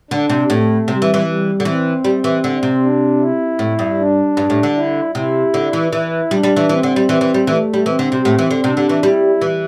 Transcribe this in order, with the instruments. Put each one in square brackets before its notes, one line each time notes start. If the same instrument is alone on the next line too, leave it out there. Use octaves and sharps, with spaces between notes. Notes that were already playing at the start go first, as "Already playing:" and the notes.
[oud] D3 [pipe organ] D4
[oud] C3
[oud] A2 [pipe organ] A3
[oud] C3 [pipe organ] G3
[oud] E3
E3
[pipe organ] G3
[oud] D3
[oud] E3 [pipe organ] C4
[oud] G3
E3
D3
C3
[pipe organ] D4
E4
[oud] A2
G2
[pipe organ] D4
[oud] G2
A2
D3
[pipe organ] E4
[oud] C3 [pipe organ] E4
[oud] D3
E3
[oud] E3 [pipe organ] E4
[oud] G3 [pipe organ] D4
[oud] G3
E3
[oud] E3 [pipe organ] C4
[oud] D3
G3
E3
E3
G3
[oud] E3 [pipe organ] A3
[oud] G3
[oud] E3 [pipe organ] C4
[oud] D3
C3
A2
E3
D3
[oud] C3 [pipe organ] D4
[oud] D3
E3
[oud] G3 [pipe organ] E4
[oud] E3